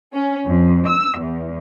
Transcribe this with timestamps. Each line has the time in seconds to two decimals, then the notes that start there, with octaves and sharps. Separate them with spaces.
0.13 C#4
0.48 F2
0.90 E6
1.21 E2